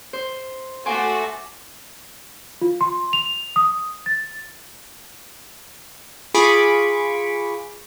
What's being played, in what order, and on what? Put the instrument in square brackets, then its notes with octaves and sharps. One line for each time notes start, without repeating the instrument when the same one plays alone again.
[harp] C5
[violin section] A3 F#4 [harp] G#5 C6 D6
[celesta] F4
C6
F7
D#6
A6
[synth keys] F4 G#4 B5 C#6 D6